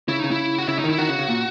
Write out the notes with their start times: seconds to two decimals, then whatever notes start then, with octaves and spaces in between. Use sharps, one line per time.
0.08 C#3 E4
0.20 C#3 D#4
0.31 E4
0.58 F#4
0.68 C#3 E4
0.79 D#4
0.84 D#3
0.89 E4
0.98 D#3 F#4
1.09 C#3
1.19 C#3
1.29 A#2